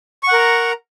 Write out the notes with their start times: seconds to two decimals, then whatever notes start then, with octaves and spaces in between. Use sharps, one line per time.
0.23 C#6
0.28 F#5
0.33 A#4
0.37 A#5